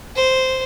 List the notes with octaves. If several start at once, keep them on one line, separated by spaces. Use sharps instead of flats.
C5